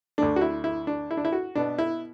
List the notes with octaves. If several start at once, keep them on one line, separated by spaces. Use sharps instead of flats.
D2 D3 A3 D4
F#4
E4
E4
D4
E4
D4
E4
F#4
B2 B3 D4
E4